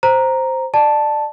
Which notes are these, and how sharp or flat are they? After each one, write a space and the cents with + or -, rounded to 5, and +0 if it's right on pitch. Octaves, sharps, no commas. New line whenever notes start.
C5 +0 A#5 +0
D5 +25 A5 +0